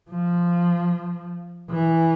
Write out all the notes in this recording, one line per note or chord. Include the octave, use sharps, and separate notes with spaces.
F3
E3